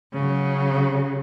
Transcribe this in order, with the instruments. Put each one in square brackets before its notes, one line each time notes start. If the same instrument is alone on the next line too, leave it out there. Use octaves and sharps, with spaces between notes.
[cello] C#3 F#3